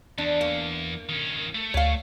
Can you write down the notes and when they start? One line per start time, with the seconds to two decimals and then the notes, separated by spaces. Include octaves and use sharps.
0.18 E2 D4
0.41 A#3
1.09 D#3 C#4
1.55 A3
1.74 D2 C#5 F5